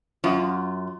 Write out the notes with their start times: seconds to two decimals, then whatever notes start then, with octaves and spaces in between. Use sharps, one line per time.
0.24 F#2 F4